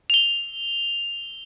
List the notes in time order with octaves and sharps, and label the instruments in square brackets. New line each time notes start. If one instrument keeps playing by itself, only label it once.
[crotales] F7 G7